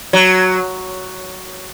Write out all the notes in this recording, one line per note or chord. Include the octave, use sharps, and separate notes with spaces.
F#3